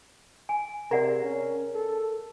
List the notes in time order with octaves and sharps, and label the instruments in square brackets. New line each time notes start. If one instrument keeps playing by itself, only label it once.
[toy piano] G#5
[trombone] C3 [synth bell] G#4 A#4 [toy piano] D5 F#5 A#5
[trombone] C#4
A4